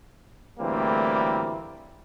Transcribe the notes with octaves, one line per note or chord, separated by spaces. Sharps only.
D2 A2 E3 G3 A#3 C4